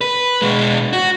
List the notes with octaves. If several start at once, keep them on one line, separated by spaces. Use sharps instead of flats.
B4
B2 G#3
F#4